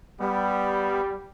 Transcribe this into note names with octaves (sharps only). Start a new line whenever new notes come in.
G3 B3